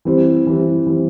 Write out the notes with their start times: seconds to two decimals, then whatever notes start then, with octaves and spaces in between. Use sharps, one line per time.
0.05 E3 G3 C4
0.47 E3 G3 C4
0.87 E3 G3 C4